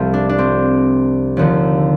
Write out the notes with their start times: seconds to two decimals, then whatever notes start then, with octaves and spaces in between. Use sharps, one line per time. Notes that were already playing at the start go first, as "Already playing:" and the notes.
Already playing: C2 C3 F3 F4 G4 A4
0.14 D4
0.29 D4
0.38 C4
1.37 D#2 D3 F3